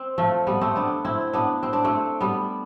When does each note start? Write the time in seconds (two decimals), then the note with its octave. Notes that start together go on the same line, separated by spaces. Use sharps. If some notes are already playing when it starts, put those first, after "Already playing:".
Already playing: C4
0.18 F3 A3
0.47 G3 B3
0.61 A3 C4
0.76 B3 D4
1.05 C4 E4
1.33 B3 D4
1.63 C4
1.73 D4
1.84 A3 C4
2.21 G3 B3